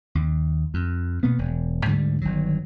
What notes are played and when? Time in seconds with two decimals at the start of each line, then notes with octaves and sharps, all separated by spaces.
0.15 D#2
0.74 F2
1.23 B2 A#3 B3
1.39 E1
1.84 D2 G#2 D3 G3
2.21 G1 D#3 F#3